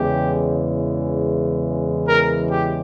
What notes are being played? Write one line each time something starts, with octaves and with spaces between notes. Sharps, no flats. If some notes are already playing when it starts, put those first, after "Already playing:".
Already playing: E2 C#3 E3 G#3 G4
A#4
G4